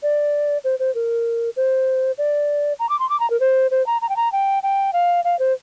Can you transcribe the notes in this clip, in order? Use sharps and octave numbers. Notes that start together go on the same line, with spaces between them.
D5
C5
C5
A#4
C5
D5
A#5
D6
C6
D6
A#5
A#4
C5
C5
A#5
A#5
G5
A#5
G5
G5
F5
F5
C5